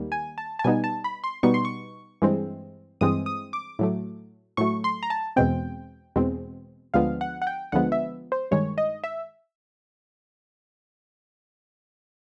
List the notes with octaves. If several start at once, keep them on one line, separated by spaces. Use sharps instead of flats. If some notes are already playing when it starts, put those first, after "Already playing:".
Already playing: D#2 D#3 G3 A#3
G#5
A5
A5
B2 G3 B3 D#4 G#5
A5
B5
C6
B2 G3 B3 D#4 C#6
C6
C#6
G2 E3 G#3 C4
G2 E3 G#3 C4 D#6
D#6
D6
A2 F#3 A3
A2 F#3 A3 C#6
C6
A#5
A5
E2 B2 G#3 C4 G5
E2 B2 G#3 C4
D2 D3 F3 G#3 B3 F5
F#5
F#5
G5
D2 D3 F3 G#3 B3 F#5
E5
C5
G2 D#3 G#3 C#5
D#5
E5